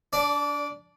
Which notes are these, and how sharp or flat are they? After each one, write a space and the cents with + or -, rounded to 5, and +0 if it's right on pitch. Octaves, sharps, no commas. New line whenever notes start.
D4 -25 D5 +0